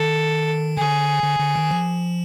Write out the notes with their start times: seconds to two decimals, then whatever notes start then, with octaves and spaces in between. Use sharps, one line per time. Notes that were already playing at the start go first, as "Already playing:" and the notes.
Already playing: D#3 A4
0.77 D3 G#4
1.23 D3
1.40 D3
1.56 D#3
1.71 F3